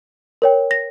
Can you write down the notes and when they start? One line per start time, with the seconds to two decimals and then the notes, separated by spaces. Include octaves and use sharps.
0.42 A#4 C#5 G5
0.71 A#6